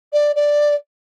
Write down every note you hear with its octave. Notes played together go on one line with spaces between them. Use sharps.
D5
D5